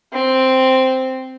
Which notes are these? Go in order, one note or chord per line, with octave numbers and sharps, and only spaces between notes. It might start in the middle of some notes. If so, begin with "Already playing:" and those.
C4